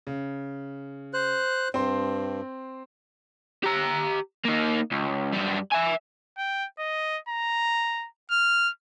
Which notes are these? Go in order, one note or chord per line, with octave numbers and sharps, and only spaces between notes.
C#3
C5 F#6
G2 C4 C6
G4 A#5
A#3 D#4
C#2
F#2 G3
E5 G#5
G5
D#5
A#5
F6